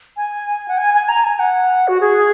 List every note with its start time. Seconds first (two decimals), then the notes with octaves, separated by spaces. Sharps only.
0.17 G#5
0.68 F#5
0.78 G#5
0.94 G#5
1.09 A#5
1.24 G#5
1.39 F#5
1.88 F#4
2.01 G#4